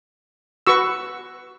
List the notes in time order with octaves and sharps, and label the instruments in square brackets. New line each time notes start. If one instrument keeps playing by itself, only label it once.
[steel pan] F#4 B4 C#6 E6